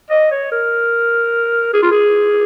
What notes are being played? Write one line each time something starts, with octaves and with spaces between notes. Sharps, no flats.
D#5
C#5
A#4
G#4
F4
G#4